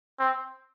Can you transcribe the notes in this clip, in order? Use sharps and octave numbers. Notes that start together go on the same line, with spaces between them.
C4